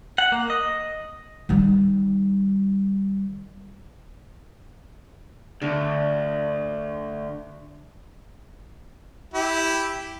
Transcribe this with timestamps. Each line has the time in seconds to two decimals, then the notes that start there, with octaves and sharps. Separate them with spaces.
0.18 F#5
0.32 A#3
0.50 D#5
1.49 D#3 G3
5.62 D2 D3
9.34 E4 G4